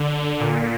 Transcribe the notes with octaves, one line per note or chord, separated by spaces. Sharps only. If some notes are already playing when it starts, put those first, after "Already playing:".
Already playing: D3
A#2